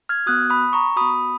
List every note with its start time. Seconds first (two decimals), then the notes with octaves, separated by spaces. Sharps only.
0.09 F6 G#6
0.26 B3 F#4 D#6 F#6
0.50 B5 D#6
0.73 A#5 C#6
0.96 B3 F#4 B5 D#6